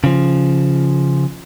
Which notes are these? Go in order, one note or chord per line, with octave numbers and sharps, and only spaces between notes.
C#3 F3